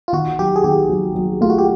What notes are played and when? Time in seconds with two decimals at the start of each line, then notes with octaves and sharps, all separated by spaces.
0.08 F4
0.13 D#3 F#4
0.39 F#3 G4
0.56 G#4
0.64 D#3 G4
0.89 F#3
1.15 F#3
1.41 A3 F4
1.50 F#4
1.58 G4